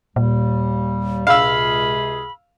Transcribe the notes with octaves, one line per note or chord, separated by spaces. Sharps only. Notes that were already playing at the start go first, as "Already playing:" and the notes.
D#2 A#2 G3
C#2 C3 G#4 F5 B5 E6